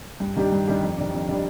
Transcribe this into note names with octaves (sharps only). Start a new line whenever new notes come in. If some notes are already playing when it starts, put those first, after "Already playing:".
G2
D#3 G3 D4 G4
G2
D#3 G3 D4 G4
F2
D#3 G3 D4
F2
D#3 G3 D4